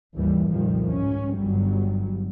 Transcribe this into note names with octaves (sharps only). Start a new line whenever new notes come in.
G#1 D#2 E3 G3
C2 F2 A#2 D#3 F3 G3
G#2 C#4
G1 G2 F#3 G3